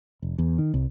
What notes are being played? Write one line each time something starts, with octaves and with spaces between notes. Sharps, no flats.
F1
E2
D#3
C2